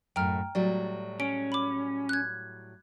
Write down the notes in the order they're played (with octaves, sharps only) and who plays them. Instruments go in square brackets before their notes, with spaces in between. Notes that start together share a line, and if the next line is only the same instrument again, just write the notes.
[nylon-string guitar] F#2 A2 [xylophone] G5 A#5 F6
[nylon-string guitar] A2 F#3 G3 [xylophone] D5
[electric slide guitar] C#4 [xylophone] D7
[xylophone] B5 D6
F#6 G#6